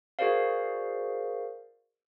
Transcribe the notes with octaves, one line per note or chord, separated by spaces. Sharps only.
F#4 G#4 A#4 C5 D5 F5